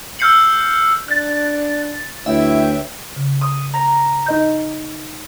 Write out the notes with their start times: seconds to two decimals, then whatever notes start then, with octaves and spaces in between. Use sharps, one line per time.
0.19 E6 F6 G6 C7 C#7 F#7
1.08 D4 F#6 A6
2.26 D2 E4 B4 C#5 E5 G5
3.16 C#3
3.41 D#6
3.74 A#5
4.26 D#4 D#5 G6